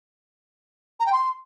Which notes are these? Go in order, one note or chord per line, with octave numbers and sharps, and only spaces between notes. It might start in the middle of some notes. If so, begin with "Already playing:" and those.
A#5
G5
C6